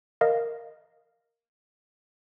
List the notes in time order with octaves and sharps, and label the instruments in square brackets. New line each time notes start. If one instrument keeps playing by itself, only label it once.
[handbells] A#4 D#5 F5